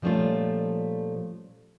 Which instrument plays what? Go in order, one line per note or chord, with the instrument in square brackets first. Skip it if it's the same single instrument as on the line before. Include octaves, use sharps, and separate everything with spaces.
[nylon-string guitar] A#2 F3 G3 A3 C#4 F4